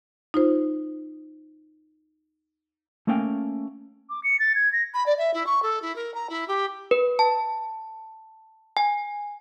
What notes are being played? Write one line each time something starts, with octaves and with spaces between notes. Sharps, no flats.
D#4 F4 C5
A3 A#3 C#4 F5 G5 G#5
D6
C#7
A6
G#6
A#6
B5
D5
E5
E4
C#6
A4
E4
A#4
A#5
E4
G4
B4
A5
G#5